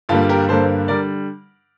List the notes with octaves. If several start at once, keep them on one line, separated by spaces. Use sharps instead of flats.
G2 D3 G3 A#3 F4 A4
G4 A#4
G2 D3 G3 A#3 A4 C5
D3 G3 A#4 D5